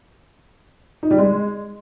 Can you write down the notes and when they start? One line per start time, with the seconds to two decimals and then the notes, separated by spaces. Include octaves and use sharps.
1.03 D#4
1.11 G3
1.18 G#3